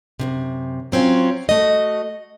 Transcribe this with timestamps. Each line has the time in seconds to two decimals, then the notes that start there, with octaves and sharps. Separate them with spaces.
0.20 F#2 A2 C3
0.92 F#3 C4 C#4 F4
1.49 A3 F#4 D#5